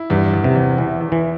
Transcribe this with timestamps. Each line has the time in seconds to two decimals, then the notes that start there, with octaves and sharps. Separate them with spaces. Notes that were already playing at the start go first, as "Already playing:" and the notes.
Already playing: E4
0.10 E2 G2
0.33 E2
0.44 C3
0.55 E2
0.78 E2 E3
1.01 E2
1.12 E3